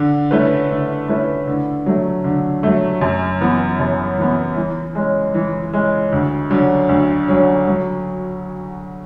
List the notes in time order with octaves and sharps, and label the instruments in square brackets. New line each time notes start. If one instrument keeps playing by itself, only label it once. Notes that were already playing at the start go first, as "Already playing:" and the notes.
Already playing: [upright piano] D3
A3 C#4 E4 B4
D3
A3 C#4 E4 B4
D3
F#3 A3
D3
F#3 A3
F#2
E3 B3
F#2
E3 B3
E3
G#3 C#4
E3
G#3 C#4
D2
D3 F#3 C#4
D2
D3 F#3 C#4
F#3